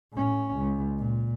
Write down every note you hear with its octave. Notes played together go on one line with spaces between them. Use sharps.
A2 C#4
C#2
A#2